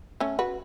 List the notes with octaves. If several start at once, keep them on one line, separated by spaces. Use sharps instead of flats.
A3 C#4
F#4 B4